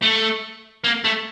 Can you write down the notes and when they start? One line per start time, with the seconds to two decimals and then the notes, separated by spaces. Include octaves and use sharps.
0.02 A3
0.84 A#3
1.05 A3